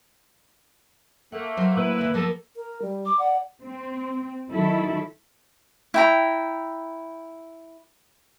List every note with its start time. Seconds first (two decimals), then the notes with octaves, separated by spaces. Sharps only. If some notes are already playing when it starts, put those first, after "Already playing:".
1.32 A3 A#3 F#5
1.57 F#3 C5
1.76 A2 A#3 E4 B4 E6
1.99 D#2 D3
2.14 F3 A#3 B3 A4
2.56 A#4
2.82 G3
3.06 D6
3.19 D5 F#5
3.62 C4
4.51 D#3 F#3 E4 A4
5.94 E4 G5 A#5